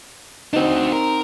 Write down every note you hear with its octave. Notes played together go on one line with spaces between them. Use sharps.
C4 D4 D#4 F#4
A#4